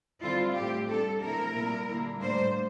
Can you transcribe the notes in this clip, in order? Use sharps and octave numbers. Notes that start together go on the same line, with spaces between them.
D3 G3 C4 E4 F4
A2 G3 C4 G4
C3 G3 D4 A4
C3 F3 A3 E4 A#4
A#2 G3 A#3 E4
D3 G3 A#3 E4
A2 G3 A#3 D4 C5